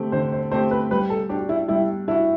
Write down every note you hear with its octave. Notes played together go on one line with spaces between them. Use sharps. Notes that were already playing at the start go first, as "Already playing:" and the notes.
Already playing: D3 A3 C4 G4
D3 C5
C5
A3 C4 G4 C5
B4
G3 B4
A4
D4 F#4 G4
E4
G3 E4
D4 E4 F#4